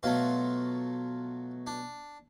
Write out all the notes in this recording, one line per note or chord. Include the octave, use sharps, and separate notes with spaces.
B2 F#3 A3 F4
D4